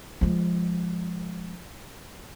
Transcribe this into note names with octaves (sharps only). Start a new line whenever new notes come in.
F3 G#3